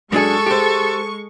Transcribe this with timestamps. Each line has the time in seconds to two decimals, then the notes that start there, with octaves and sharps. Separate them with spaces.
0.12 F#2 G#3 D4 G#4 A4 C#6
0.46 G4 C5